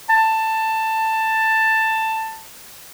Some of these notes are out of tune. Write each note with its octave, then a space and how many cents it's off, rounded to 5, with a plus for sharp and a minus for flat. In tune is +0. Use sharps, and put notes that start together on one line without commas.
A5 +10